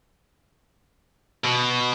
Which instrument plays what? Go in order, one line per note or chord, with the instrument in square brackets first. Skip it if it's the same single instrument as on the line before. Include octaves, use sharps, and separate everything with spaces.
[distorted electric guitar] B2